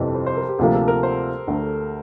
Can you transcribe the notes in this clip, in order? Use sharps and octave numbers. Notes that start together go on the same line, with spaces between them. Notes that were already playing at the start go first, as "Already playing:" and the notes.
Already playing: G1 F2 C3 E3 G4 A4
C5
C5
A#4
G4
D2 C3 F3 A#3 G4
A4
A#4
C5
D2 D3 A3